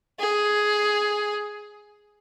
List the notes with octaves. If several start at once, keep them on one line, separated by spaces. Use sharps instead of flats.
G#4